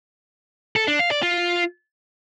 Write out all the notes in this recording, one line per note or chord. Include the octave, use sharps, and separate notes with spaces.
A4
D4
F5
D5
F4